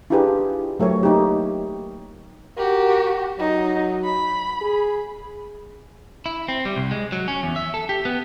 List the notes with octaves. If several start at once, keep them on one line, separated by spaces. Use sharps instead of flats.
D4 E4 F4 G4 G#4 B4
F#3 A3 A#4 C#5
A#3 D#4 G4
F#4 G4 A#4
F#3 D#4
B5
G#4
E4
C4
G3
C2
G#3
F#3
C#4
E2
E5
A4
G4
B3